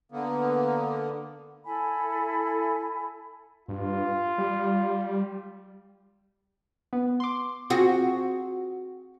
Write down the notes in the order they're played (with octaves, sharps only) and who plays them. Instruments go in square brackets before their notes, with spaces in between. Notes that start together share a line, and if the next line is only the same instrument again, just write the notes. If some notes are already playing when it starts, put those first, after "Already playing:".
[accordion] D3 A#3 B3
[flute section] E4 A4 G#5 B5
[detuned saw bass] G2 [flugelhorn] F4
[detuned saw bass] G3
[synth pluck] B3
C6 D6
[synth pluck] C4 F4 G#4 [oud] F#4